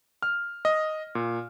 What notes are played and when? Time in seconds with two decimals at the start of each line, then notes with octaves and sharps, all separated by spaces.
0.22 F6
0.65 D#5
1.15 A#2